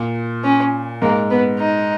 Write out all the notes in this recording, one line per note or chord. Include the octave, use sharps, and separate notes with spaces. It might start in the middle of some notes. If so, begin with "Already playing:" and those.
Already playing: A#2
C#4
G#2 A#3
B3
D#4